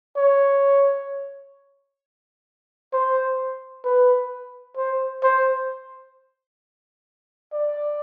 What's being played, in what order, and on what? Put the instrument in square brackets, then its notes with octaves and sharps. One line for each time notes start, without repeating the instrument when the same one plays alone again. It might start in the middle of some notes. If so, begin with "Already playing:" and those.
[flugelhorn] C#5
C5
B4
C5
C5
D5